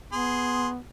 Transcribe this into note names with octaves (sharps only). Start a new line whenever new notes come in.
B3 G#4 C6